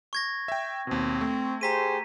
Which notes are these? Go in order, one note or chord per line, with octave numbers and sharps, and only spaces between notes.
C#6 G#6 A#6
E5 G5
D#2 B2 C4
A3
G4 G#4 C5 A#5 B6 D#7